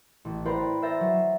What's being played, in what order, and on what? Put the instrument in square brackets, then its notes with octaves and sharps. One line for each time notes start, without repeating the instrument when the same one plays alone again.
[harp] A1
B4 C5 D5 G5 A#5 B5
C5 E5 A#5 G6 A6 A#6
F#3